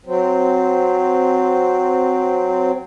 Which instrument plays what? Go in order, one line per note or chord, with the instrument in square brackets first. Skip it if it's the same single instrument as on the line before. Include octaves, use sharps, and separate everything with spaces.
[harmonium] F#3 C4